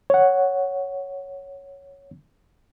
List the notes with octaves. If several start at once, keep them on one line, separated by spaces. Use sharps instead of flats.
C#5 F#5